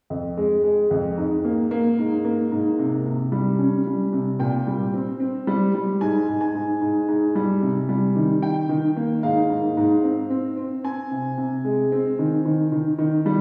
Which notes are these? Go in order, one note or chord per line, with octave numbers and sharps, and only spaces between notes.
F2
G#3
G#3
F2
G#2
A#3
A#3
G#2
A#3
G#2
C3
C3
G3
C#4
G3
C3
A#2 G5
G3
C4
C4
G3
G3
G#2 G#5
G#2
G#5
G#2
G#2
G#2
G3
C3
G3
D#3
D#3 G5
D#3
A#3
G#2 F5
G#2
G#2
C4
C4
C4
C4 G#5
C3
C3
G#3
C4
D#3
D#3
D#3
D#3
G3